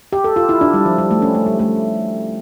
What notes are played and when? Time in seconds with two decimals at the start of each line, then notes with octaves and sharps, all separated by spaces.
0.12 G4
0.24 A4
0.36 F4
0.49 E4
0.61 D4
0.74 G3
0.85 F3
0.98 G3
1.11 A3
1.22 C#4
1.35 A3
1.46 G3
1.59 A3